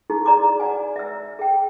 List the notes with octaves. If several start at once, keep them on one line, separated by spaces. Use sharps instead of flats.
D#4 E4 F#4 G#4 C#6
G#4 D5 A#5 C6 D6
D5 F#5 G#5
E5 E6
G#4 G5